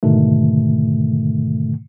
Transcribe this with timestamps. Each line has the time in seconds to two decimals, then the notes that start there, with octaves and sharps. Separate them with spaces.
0.03 G#2 B2 D3 D#3 A3